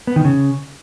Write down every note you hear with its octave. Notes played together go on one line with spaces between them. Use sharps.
B3
D#3
C#3